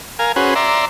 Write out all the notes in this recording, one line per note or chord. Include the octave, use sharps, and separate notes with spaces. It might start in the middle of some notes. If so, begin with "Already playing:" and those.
A#4 F5 G#5
C#4 F#4 G#4 B4 C5
D5 E5 A#5 C6